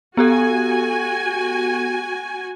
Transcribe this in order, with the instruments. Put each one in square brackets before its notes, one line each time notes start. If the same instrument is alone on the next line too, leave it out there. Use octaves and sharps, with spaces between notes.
[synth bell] B3 G4 A4 [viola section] F#4 G#5